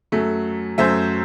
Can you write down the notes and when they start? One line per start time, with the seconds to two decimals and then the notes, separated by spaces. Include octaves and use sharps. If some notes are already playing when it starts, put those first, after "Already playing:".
0.12 F#2 F#3 A3
0.78 F#2 F#3 A3 C5 E5